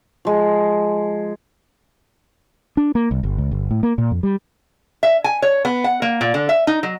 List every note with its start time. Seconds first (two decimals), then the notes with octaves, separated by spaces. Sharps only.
0.25 F3 G#3
2.77 D4
2.95 A#3
3.11 C2
3.23 G1
3.38 C#2
3.51 G1
3.71 A2
3.83 A#3
3.98 A#2
4.11 F2
4.23 G3
5.03 E5
5.24 G#5
5.42 C#5
5.65 B3
5.84 F#5
6.02 A#3
6.21 A#2
6.34 D3
6.49 E5
6.67 D#4
6.83 F#3